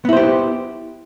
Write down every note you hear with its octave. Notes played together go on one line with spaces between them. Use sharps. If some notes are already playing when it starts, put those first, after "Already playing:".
B3 E4 G4 C5